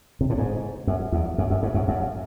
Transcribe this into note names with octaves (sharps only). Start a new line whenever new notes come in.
C3
A2
G#2
F#2
E2
F#2
F#2
G#2
F#2
F#2